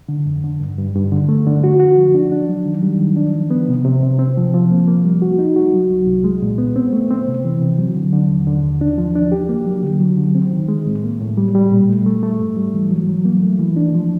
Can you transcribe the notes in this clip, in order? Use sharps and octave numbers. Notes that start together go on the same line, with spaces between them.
D3
F2
D3
G2
G2
G2
D3
A3
D3
F#4
F#4
F3
D4
D4
F#3
D#3
G3
D#3
D4
F3
B3
C3
C3
C3
C4
F3
F3
A#3
A#3
G3
F#4
D#4
F#4
F#3
C2
C2
G#3
A#2
B3
C4
A3
C4
C3
E3
C3
F#3
D3
D3
D#2
D3
D#2
D4
F3
D4
G4
A#3
F#3
D3
F#3
D3
C4
D#3
G#3
A2
A#3
A2
G3
G3
A#2
A3
A3
A3
G#2
G3
E3
F#3
F#3
A#3
A3
E3
D4
F3